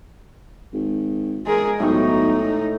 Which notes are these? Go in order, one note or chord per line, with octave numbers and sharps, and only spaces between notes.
G#1
G#3 G#4 A#4
B1 A2 D#4 G5 C#6